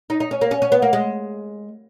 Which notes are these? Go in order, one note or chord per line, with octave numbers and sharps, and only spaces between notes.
D#4
D#4
C#4
A#3
C#4
C#4
B3
A#3
G#3